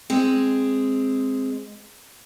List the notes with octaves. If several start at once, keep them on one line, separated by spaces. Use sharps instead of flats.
G#3 C4